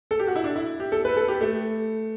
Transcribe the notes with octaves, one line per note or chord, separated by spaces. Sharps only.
A4
G4
F#4
E4
D4
E4
G4
A4
B4
A4
G4
A3